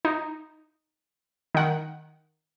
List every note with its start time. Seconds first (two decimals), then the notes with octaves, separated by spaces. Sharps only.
0.05 D#4
1.55 D#3 F#5